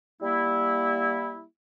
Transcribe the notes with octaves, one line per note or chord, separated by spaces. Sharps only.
G3 A#3 E4